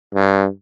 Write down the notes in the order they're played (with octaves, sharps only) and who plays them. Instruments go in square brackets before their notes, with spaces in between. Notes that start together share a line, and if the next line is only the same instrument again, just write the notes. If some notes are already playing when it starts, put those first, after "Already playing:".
[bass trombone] G2